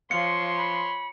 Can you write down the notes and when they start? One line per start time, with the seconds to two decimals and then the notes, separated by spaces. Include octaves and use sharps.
0.11 F3 C#5 F5 C6 C#7
0.57 B5